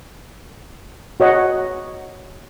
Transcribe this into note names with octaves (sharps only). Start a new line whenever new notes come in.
F#4 C#5 D#5 F#5